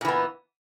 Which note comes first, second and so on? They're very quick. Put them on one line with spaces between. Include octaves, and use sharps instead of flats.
A#2 E3 B3